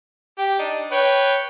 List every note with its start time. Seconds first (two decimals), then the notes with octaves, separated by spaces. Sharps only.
0.38 G4
0.59 D4 D#4
0.92 B4 C#5 G5